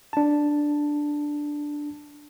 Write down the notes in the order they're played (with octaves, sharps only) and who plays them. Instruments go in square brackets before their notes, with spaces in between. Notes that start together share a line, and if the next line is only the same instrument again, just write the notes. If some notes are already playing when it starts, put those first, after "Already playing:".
[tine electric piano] D4 A5